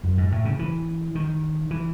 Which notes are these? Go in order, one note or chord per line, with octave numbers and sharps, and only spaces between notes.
F#2
G#2
A2
C#3
E3
D#3
E3